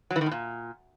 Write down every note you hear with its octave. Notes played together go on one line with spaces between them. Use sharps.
F#3
E3
D#3
A2
A#2